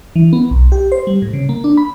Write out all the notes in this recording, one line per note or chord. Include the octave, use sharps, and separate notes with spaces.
E3
B3
B1
G4
C5
G3
A2
C#3
A#3
D4
B5